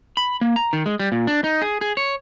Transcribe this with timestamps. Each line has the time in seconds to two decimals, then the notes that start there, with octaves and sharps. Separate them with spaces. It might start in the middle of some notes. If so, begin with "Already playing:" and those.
0.17 B5
0.41 A#3
0.56 A#5
0.73 D#3
0.86 G#3
1.00 G3
1.12 A#2
1.27 D4
1.44 D#4
1.62 G#4
1.81 G#4
1.97 C#5